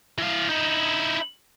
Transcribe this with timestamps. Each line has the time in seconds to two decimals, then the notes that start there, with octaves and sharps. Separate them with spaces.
0.18 E3 F5
0.49 D#4 E4